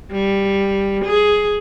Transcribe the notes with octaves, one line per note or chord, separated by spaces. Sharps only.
G3
G#4